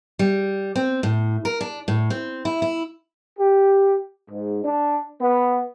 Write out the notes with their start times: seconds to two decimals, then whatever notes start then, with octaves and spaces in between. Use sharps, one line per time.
0.19 G3
0.76 C4
1.03 A2
1.45 A#4
1.61 D4
1.88 A2
2.10 C4
2.45 E4
2.62 E4
3.39 G4
4.30 G#2
4.63 D4
5.21 B3